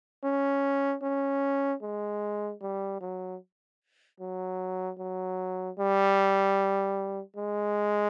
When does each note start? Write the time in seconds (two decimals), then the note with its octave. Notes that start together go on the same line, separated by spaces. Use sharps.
0.24 C#4
1.03 C#4
1.82 G#3
2.61 G3
3.01 F#3
4.20 F#3
4.99 F#3
5.79 G3
7.37 G#3